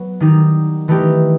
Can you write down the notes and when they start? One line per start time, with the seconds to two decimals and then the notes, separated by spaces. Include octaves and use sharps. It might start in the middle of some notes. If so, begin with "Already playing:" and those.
Already playing: F#3 B3
0.20 D#3 G3 D#4
0.88 E3 A3 D#4 G4